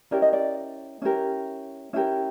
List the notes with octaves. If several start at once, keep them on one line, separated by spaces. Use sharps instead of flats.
C#4 E4 G4 A#4 D5
D#5
D5
C#4 E4 G4 A#4
C#4 E4 G4 A#4